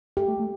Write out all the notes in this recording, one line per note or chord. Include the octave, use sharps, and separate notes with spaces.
A3 G4
A3
A3